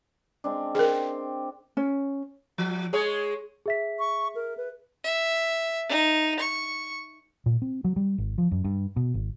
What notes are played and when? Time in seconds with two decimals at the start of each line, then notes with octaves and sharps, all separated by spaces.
0.44 G#3 C4 D4
0.75 G#4 A#4 C5 G5
1.77 C#4
2.58 F3
2.93 G#3 G#4 C#5
3.66 G#4 E5 B6
3.99 C#6
4.35 A#4
4.57 B4
5.04 E5
5.89 D#4
6.40 C#6
7.46 A#2
7.62 C4
7.84 F#3
7.96 G3
8.18 G#1
8.38 F3
8.51 F#2
8.64 G2
8.96 B2
9.14 G#1